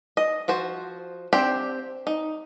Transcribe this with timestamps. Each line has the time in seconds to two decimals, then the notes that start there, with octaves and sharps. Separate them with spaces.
0.17 D#5
0.48 F3 F#4 C5
1.33 C4 D4 G4 C5
2.07 D#4